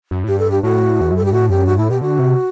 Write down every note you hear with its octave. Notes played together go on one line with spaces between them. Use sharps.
F#2
A2
G2 G4
A4
G4
A2 F#4
E2
F#2
A4
G2 G4
A2 F#4
F#2 G4
G2 F#4
A2 E4
B2 G4
D3 F#4
C3